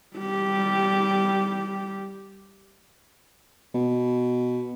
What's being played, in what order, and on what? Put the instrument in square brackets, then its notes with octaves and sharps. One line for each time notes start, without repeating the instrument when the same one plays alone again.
[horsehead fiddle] G3 G4
[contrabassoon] B2